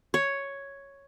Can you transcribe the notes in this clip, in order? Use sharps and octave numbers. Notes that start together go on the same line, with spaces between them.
C#5